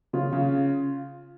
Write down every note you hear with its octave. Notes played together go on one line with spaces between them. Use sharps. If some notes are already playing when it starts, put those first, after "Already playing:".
C#3 F4
C#3